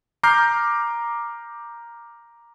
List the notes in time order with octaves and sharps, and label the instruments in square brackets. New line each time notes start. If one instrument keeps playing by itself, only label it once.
[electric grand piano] A#5 D6 F6 G6 C7